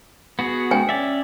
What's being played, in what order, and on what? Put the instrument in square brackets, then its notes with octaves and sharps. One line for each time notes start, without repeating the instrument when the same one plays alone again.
[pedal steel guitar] B3 F#4 G#4
[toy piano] C#5 G5 G#5
[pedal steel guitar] C#4 D5 E5